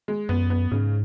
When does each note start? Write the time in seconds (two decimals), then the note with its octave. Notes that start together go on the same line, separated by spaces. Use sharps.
0.08 G#3
0.29 F#2 B3
0.50 B3
0.71 G#2 C#3